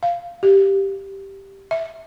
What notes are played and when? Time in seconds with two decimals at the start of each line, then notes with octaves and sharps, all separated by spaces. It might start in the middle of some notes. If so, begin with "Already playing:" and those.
0.03 F5
0.43 G4
1.71 E5